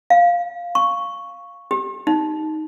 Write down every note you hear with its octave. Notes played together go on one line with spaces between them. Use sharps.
F5
C#6
G4
D#4